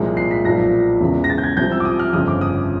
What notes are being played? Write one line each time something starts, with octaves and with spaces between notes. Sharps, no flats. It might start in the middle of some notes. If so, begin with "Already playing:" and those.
Already playing: C2 A#2 F3 G#3
C7
B6
B1 A#2 F3 A#6
E1 E2 C#3
A#6
A6
G6
G#6
C2 C3 F3 G6
E6
D6
D#6
F6
G1 F2 C#3 F3 D#6
D6
D#6